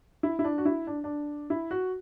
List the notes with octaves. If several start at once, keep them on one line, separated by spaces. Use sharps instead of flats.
E4
E4
D4
F#4
E4
D4
D4
E4
F#4